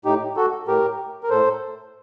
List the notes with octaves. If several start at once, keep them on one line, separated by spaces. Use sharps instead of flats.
A2 D#4 G4
F#4 A4
A2 G4 A#4
A#4
A2 A4 C5